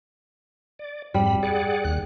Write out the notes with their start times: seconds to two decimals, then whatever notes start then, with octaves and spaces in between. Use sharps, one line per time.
0.79 D5
1.14 F2 G#2 G3 B5
1.43 G#4 D5 F#5
1.84 D#2 F#6